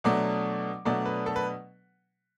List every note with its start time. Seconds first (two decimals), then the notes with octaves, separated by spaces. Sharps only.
0.04 B2 F#3 A3 D4 D6
0.85 B2 F#3 A3 D4 D5
1.06 B4
1.26 A4
1.36 B4